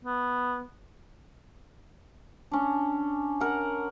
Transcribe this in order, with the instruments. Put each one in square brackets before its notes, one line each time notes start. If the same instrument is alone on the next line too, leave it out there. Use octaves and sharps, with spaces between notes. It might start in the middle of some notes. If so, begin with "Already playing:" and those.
[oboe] B3
[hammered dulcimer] C#4 D4
A#4 F#5